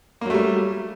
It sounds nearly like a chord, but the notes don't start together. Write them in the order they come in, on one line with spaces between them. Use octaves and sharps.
A#3 F#3 A3 G3